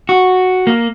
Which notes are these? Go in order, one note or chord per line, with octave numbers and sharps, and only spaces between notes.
F#4
A#3